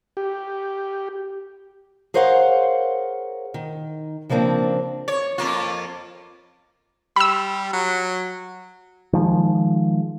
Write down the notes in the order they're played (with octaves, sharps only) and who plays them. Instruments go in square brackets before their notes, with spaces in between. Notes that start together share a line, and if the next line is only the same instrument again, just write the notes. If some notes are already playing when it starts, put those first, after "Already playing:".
[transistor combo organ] G4
[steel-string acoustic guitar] G#4 A#4 C5 C#5 F5 F#5
D#3
C#3 F3 A#3 C4 D4
[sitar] C#5
F2 A#3 F4
[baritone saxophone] G3 [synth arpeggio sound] B5 E6
[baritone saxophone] F#3
[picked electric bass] D#3 F3 G#3